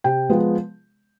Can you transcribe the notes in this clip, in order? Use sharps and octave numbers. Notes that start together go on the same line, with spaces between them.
C3 G5
F3 G#3 B3